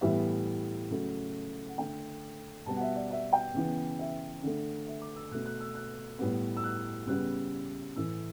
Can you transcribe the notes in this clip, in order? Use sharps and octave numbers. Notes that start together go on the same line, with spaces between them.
A2 E3 G3 B3 E5
C#3 F#3 A3
F#5
D3 A3 G5
B2 G3 B3 A5
F#5
E5
D5
E5
G5
C#3 E3 B3
E5
D3 A3
E5
D6
E6
B2 A3 F#6
F#6
E6
F#6
A2 G3 B3
E6
F#6
C#3 G3 B3 F#6
A2 E3 A3 E6